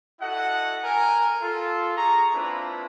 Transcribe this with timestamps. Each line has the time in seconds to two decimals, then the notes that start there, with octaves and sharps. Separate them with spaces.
0.20 E4 F#4 A4 D#5 F#5
0.83 A#4 G#5
1.41 F4 A4
1.96 G#4 A#5 C#6
2.34 A#3 C4 D4 E4 F4 B4